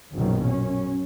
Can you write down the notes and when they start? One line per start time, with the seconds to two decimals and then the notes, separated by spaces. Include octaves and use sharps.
0.15 A#1 F#2 B2 D#3
0.44 F#2 C#4